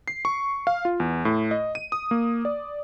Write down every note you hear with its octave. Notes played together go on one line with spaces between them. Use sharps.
C7
C#6
F5
F4
E2
A2
D#5
D#7
D#6
A#3
D5